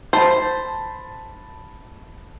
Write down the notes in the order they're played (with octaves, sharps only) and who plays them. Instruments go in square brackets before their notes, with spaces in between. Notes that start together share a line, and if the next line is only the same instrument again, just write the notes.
[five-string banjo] C5 [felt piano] A5 B5